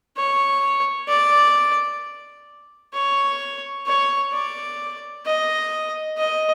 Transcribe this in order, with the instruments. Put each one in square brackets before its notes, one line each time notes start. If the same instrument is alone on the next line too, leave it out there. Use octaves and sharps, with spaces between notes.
[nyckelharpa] C#5
D5
C#5
C#5
D5
D#5
D#5